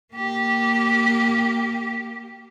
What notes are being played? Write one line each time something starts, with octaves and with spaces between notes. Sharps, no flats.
A#3 G4